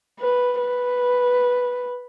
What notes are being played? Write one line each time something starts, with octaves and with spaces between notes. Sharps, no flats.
B4
B4